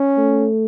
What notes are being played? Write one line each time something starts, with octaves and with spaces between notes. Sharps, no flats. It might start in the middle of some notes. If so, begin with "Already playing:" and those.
Already playing: C#4
A3